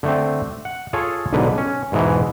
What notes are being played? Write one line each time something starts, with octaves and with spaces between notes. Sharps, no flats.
D3 A3 C4
F#5
F4 G#4 A4 C#5
B1 G#2 D3 B4
C#4
E2 G#2 B2 E3